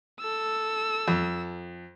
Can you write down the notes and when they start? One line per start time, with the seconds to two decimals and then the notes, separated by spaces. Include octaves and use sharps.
0.20 A4 E6
1.08 F2